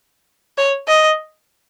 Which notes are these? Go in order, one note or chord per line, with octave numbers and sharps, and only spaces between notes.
C#5
D#5